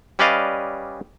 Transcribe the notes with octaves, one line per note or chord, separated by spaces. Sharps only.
G3 C#4 B4 D5 D#5 F5